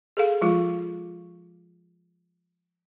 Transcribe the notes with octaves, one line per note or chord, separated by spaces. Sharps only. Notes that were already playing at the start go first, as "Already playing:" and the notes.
G#4 A4 F5
F3 G#3 F4